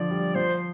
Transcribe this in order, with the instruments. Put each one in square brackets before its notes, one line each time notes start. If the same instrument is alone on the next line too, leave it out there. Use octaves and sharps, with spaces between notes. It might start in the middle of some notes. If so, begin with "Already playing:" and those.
Already playing: [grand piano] D3 F3 [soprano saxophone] D5
[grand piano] G3
[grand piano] F3 [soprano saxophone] C5